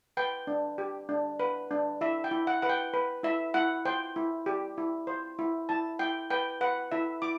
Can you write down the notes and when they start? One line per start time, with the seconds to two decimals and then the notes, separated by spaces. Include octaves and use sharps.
0.17 B4 G5
0.47 D4
0.78 G4
1.09 D4
1.40 B4
1.71 D4
2.01 E4 E5
2.24 G5
2.31 E4
2.47 F#5
2.62 B4 F#5
2.70 G5
2.94 B4
3.23 E4 E5
3.54 E4 F#5
3.85 C5 G5
4.16 E4
4.46 G4
4.78 E4
5.07 C5
5.39 E4
5.69 E4 A5
5.99 E4 G5
6.30 B4 G5
6.61 B4 F#5
6.92 E4 E5
7.22 E4 D6